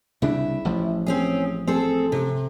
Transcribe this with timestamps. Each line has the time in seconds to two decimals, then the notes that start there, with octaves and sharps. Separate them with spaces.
0.22 C2 C#3 D4 E4
0.65 A1 F3
1.06 C4 C#4 G#4
1.67 C4 G#4 A4
2.12 C3